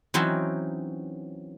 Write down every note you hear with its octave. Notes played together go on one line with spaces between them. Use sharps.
E3 F#3 C4 C#4 D#4